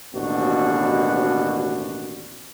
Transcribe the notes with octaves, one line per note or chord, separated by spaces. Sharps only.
A1 D#2 B2 D4 F#4